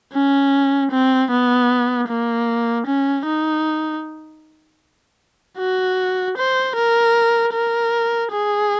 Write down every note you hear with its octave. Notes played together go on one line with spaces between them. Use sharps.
C#4
C4
B3
A#3
C#4
D#4
F#4
C5
A#4
A#4
G#4